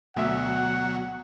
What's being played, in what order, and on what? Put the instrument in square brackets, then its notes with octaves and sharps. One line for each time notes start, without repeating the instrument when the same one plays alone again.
[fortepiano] D2 E5 [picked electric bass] B2 [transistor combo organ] F#3 [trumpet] F#5